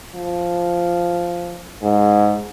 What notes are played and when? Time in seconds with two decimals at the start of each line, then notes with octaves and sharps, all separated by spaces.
0.15 F3
1.82 G#2